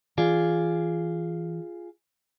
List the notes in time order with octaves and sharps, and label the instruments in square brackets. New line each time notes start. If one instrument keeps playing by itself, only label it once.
[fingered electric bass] E3 [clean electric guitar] F4 G#4 D5